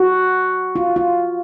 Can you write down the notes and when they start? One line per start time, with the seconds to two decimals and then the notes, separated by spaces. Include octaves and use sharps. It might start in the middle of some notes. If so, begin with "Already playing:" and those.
Already playing: F#4
0.76 F4
0.96 F4